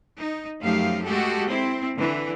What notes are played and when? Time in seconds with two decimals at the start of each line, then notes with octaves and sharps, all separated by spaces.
0.19 D#4
0.61 F#2 F3 A3 D#4 G4 F5
1.04 G#3 A3 F#4 G4 A4
1.48 C4 E4
1.97 D3 E3